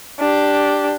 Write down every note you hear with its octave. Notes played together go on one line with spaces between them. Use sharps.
D4 G4